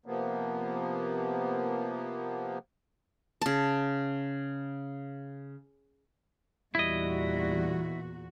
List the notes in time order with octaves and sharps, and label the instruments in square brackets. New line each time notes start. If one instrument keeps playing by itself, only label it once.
[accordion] C3 F3 A#3 B3
[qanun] C#3 A5
[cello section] E2 A#2 F#4 [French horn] G3 [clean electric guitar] E4 D#5